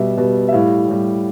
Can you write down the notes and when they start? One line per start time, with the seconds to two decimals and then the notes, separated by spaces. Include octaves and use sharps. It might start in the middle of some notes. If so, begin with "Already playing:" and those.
Already playing: B2 G3 E5
0.17 B2 G3
0.48 E5
0.52 A2 G3 F5
0.88 A2 G3